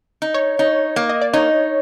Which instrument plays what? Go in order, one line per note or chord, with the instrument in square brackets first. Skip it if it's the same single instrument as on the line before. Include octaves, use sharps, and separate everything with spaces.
[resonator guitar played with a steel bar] D#4
[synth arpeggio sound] C#5
[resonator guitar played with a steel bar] D#4
A#3
[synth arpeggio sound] D#5
D5
[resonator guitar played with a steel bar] D#4 [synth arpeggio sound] C#5